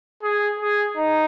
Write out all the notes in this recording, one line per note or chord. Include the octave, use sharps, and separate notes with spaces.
G#4
G#4
D#4